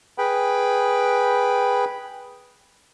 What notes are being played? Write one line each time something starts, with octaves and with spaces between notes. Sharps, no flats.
G#4 B4 G5 B5